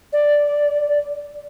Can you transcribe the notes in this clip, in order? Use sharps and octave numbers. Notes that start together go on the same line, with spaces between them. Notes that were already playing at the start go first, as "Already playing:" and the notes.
D5